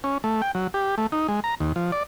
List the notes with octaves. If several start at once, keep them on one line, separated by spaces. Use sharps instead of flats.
C#4
A3
G5
F#3
G4
A3
D#4
G#3
A#5
D#2
F3
D5